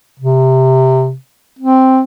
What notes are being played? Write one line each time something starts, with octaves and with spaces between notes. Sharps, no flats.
C3
C4